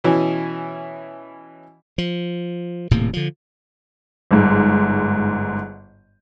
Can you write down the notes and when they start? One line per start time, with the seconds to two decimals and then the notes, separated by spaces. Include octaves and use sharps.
0.04 B2 E3 C#4 E4
1.98 F3
2.91 D#1 A2 C3 A#3
3.13 D3 F3
4.31 G1 G#2